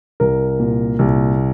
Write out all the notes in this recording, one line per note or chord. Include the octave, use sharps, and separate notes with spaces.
C2 A#4
A#2
C2